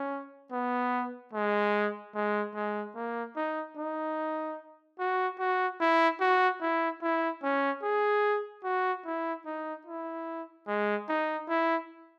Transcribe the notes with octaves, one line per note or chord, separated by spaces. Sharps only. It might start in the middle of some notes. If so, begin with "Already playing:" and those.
Already playing: C#4
B3
G#3
G#3
G#3
A#3
D#4
D#4
F#4
F#4
E4
F#4
E4
E4
C#4
G#4
F#4
E4
D#4
E4
G#3
D#4
E4